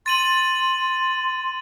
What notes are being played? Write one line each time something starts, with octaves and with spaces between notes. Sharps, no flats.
C6 A6 D#7 F#7